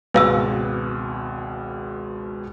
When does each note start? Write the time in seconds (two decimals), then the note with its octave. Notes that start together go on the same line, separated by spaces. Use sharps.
0.14 G#1 C#2 B2 B4 F5 E6